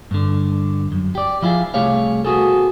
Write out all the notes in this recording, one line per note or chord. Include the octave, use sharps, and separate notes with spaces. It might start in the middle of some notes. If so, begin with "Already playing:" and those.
G2 D3
F#2
G4 D5
F3 E4 F4 G#4
C2 A3 G4 G#4 C#5 F5
B3 F#4 G#4 A4